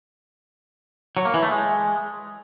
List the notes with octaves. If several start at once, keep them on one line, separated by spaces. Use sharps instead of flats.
F#3
A#3
E3
A3
G#3